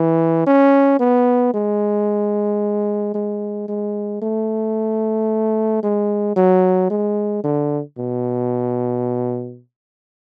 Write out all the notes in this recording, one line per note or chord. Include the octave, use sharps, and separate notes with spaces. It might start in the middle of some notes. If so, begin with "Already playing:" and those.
Already playing: E3
C#4
B3
G#3
G#3
G#3
A3
G#3
F#3
G#3
D3
B2